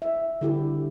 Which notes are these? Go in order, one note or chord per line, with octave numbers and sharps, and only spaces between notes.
E5
D3 E4 G4